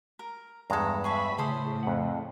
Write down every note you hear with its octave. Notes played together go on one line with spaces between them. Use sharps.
A#4
E2 G2 G#3 A4 A#5
G#4 C#5 E5 A5 B5 C#6
A2 C#3 G#4 A4 C5 D#6
F2 F#5